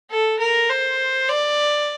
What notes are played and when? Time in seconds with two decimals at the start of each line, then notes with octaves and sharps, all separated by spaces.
0.10 A4
0.39 A#4
0.70 C5
1.29 D5